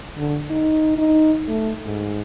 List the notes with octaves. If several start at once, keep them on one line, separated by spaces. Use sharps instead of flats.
D3
D#4
D#4
A3
G#2